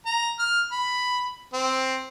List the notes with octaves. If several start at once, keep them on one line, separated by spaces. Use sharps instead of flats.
A#5
F6
B5
C4